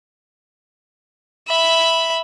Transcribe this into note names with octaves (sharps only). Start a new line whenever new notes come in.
E5 B5